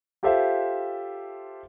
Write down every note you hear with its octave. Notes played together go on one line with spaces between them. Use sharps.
F4 G4 A4 C5 E5 F5